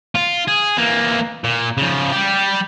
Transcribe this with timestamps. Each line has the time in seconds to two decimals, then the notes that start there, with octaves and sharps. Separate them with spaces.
0.15 F4
0.48 G#4
0.77 E3 A#3
1.44 A#2
1.77 C#3 F3
2.13 G3 G4